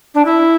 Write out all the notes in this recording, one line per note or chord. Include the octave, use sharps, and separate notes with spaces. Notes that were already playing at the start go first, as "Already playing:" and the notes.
D4
E4